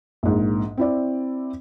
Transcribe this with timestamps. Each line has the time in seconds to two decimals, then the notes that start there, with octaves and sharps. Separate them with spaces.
0.23 A#1 G#2
0.77 C4 E4 D5